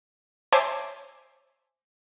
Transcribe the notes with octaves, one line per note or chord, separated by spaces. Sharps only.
C5 C#5 E5 G#5 A5 D6